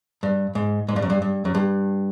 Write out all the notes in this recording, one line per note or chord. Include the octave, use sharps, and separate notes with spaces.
G2
G#2
G#2
G2
F#2
G2
G2
F#2
G2